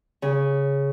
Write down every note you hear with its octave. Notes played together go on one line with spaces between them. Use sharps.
C#3